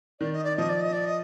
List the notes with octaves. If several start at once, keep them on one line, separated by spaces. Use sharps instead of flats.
D#3 D5
D#5
D5
F3 D#5
D5
D#5
D5
D#5